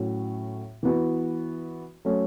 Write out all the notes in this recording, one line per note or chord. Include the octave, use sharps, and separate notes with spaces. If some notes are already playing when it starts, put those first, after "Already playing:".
Already playing: A2 F#3 C#4 F#4
E3 B3 F#4
F#3 A3 C#4